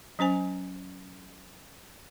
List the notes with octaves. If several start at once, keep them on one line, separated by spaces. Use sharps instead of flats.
F#3 C#4 C5 G#5